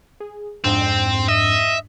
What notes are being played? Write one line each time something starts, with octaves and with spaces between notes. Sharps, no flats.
G#4
F2 G#2 C4 D4
D#5 E5